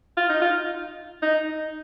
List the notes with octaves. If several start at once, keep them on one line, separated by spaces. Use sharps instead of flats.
F4
D#4
F4
D#4